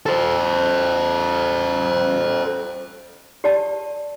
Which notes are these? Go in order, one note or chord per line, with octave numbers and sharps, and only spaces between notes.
A4 C5
G4 D5 A5